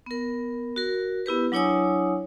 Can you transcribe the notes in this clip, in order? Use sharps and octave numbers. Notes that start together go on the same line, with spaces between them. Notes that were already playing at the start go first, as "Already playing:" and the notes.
B3 A#4
F#4 A#4
B3 E4 G4 B4
F#3 D4 E4 C#5 G#5 D#6